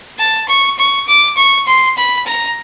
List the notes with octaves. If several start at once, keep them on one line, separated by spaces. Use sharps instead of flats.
A5
C#6
C#6
D6
C#6
C6
B5
A#5